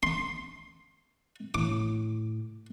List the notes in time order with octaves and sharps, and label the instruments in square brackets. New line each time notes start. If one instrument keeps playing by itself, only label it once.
[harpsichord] C6
[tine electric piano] A2 [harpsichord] D6